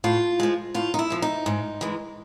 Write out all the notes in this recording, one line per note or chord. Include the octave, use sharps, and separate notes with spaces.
A2 F4
F3 G#3
A2 F4
D#4
E4
F3 G#3
D#4
G#2
E3 G#3